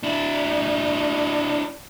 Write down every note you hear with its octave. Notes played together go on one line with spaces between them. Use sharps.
D4 E4